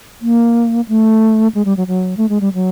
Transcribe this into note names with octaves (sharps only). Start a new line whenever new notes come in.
A#3
A3
G#3
G3
F#3
F#3
A3
G#3
G3
F#3